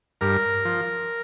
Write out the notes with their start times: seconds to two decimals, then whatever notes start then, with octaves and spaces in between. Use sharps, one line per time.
0.21 G2 A#4
0.65 F3